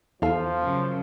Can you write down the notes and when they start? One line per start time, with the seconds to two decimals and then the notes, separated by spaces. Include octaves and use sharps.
0.22 E2 F3 F4 A4 E5 F5
0.61 F#2 C#3